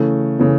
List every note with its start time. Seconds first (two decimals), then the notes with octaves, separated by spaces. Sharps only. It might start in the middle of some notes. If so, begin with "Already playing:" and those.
Already playing: C#3 E3 A3
0.39 C#3 E3 A3